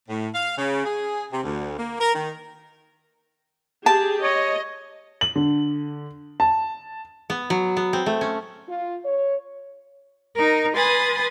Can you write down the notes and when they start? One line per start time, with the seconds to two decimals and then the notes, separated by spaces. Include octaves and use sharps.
0.09 A2
0.33 F5
0.58 C#3
0.85 G#4
1.32 C3
1.44 D2
1.79 A#3
2.00 A#4
2.14 D#3
3.86 G4 G#4 A5
4.23 C#5 D#5
5.21 F#7
5.36 D3
6.40 A5
7.30 B3
7.50 F#3
7.77 B3
7.93 C4
8.06 A3
8.21 C#4
8.68 F4
9.05 C#5
10.34 D#4 A#4
10.75 B4 G#5 C6 D#6 A6